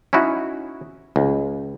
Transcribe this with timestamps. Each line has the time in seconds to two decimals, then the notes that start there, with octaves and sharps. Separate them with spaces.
0.13 C#4 D#4 E4 F#4
1.16 C#2